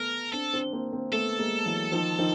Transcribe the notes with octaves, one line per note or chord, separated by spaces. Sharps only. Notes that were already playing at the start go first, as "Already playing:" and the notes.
Already playing: A3 B3 A#4
C4 D4 A4
C4 D4
A#3 C4
A#3 C4
A3 B3 A4
G#3 A#3
E3 F#3
D#3 F3
D#3 F3